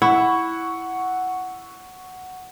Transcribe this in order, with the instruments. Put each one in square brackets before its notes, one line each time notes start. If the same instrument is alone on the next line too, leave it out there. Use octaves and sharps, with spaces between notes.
[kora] E4 [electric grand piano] F#5 C#6 E6